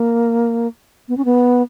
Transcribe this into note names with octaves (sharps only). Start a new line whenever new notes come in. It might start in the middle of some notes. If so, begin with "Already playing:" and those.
Already playing: A#3
B3
C#4
B3